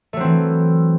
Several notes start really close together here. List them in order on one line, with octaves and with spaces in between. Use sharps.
A3 F#3 C4 E3